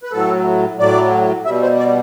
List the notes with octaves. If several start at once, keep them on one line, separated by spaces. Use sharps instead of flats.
B4
A2 F#3 A4
A2 F#3 D5
B2 G3 E5
C5
D5